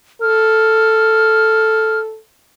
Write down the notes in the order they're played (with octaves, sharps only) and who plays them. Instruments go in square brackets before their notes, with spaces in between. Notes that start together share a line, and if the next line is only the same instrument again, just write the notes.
[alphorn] A4 [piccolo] F6